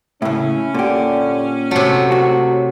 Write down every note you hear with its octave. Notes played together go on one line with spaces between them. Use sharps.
A2 C#3 C#4 E4
A#2 D3 G4
C3 F#3 A3
F#4